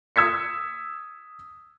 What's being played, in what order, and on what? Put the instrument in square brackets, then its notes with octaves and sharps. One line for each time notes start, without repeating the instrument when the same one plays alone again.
[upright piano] D#6 E6 G#6 B6 C#7